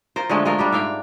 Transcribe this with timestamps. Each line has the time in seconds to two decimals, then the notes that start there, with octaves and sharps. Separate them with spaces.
0.16 F4 A#4 C5
0.29 D3 F3 G#3 A3
0.45 G#3 A3 F4 A#4
0.59 G3 D4 G4
0.72 G#2 E5 F5 G5